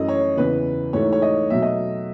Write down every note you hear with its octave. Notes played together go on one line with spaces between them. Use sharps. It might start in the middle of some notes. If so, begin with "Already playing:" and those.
Already playing: F#2 E3 A3 D#5
C#5
E2 C#3 E3 B4
G#2 E3 A3 C#5
C#5
D#5
B2 F#3 A3 E5
D#5